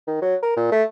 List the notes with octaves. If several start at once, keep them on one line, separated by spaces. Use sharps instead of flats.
D#3
F#3
A#4
A#2
A3